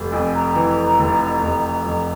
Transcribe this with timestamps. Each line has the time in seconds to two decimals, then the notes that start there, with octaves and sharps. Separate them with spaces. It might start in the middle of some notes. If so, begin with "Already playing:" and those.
Already playing: F1
0.12 F2 G#5
0.34 A#5
0.55 E3
0.99 F1
1.42 F1
1.86 F2